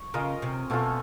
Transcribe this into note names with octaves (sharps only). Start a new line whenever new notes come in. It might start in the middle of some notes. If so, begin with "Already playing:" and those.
Already playing: C#5
C#3 C#4 F4 A#4 D#5
C3
B2 A3 C#4 F4 A4